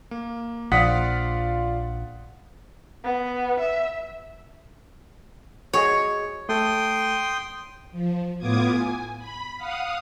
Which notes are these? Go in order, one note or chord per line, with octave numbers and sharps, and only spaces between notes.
A#3
A#1 F3 F4 D5 F5 F#5 D#6 B6
B3
E5
F#4 G#4 C#5 D#5
A3 A4 G5 C6 D#6
F3
A2 B3 F4 D6 D#6 G#6
G#5
B5
F5 F#5 D#6